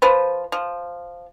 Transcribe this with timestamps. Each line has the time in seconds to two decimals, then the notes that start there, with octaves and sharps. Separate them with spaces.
0.02 F3 B4 C5
0.52 F3